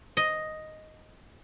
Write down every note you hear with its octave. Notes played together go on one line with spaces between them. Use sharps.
D#5